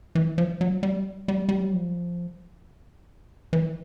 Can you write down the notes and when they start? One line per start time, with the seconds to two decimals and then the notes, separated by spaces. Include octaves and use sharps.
0.15 E3
0.38 F3
0.61 F#3
0.83 G3
1.28 G3
1.49 G3
1.61 F#3
1.73 F3
3.53 E3